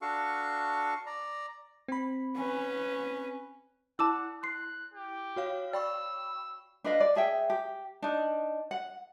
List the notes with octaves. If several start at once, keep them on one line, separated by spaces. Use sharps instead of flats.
D4 F#4 A4 F5 C#6
D5 A#5
C4 B5
C#4 B4
E4 F#5 A5 D6 E6
C6 F#6 C7
G4
F#4 C#5 F5
D5 G5 B5 C#6 E6
D4 B4 D#5 F5
D5
G#4 E5 G5
G4
D4 D#4
F#5